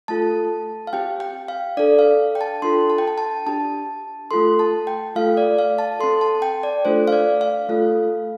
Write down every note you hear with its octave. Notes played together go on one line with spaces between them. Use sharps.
A3 F4 A4 A5
F5
C4 G4 G5
G5
F5
D4 A4 D5
F5
G5
A5
D4 F4 A4 C6
A5
G5
A5
A5
D4 G4 A5
A3 F4 A4 C6
A5
G5
A3 F4 A4 F5
D5
F5
A5
C4 A4 C6
A5
G5
D5
A3 D4 F4 A4 C5
F5
D5
F5
A3 F4 A4